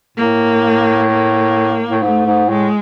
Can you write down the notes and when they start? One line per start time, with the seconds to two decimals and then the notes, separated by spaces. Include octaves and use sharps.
0.17 A2 A#3
1.10 A#3
1.90 A2
2.03 G#2 A3
2.26 G#2
2.49 A2 G#3